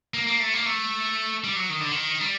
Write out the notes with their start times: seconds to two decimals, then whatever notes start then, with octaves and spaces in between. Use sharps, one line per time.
0.14 A#3
0.27 A#3
0.40 A3
0.53 A#3
0.66 A3
1.44 G3
1.56 F#3
1.70 D#3
1.81 D3
1.91 D#3
2.21 G3